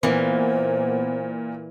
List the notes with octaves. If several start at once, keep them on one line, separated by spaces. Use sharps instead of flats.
A#2 E3 A#3 B3 C5